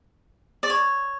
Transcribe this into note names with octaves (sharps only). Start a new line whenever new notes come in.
D5
C#5